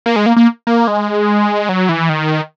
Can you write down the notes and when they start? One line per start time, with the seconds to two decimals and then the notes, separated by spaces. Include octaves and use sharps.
0.06 A#3
0.16 G#3
0.26 A#3
0.36 A#3
0.67 A#3
0.87 G#3
1.69 F#3
1.89 E3
2.09 D#3